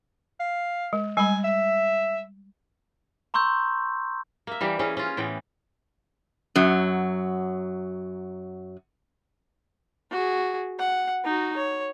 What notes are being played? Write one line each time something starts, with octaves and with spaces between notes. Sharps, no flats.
F5
G#3
G3 G#3 G#5 B5
E5
A#5 C6 C#6 E6 G6
A#3 E5
E3 G3 G4
E3 C#4 G#4
C#4 F4
A2 E3 B3 G5
F#2 F#3
F#4 G#4
F#5
D#4 F#4
C#5